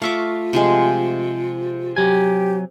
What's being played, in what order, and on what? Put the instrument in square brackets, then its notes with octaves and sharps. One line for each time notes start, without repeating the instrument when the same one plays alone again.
[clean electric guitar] A3 E5 [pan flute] F4 [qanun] F5 C#6 D6
[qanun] C3 F3 G#3
[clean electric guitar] F#3 G#5 [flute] G4